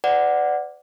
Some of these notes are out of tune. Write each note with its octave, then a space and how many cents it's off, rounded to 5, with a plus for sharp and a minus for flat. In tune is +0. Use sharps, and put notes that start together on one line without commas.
B4 +45 D5 +0 F#5 +0